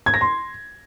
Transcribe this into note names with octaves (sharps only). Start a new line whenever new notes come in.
G#6
A#6
C6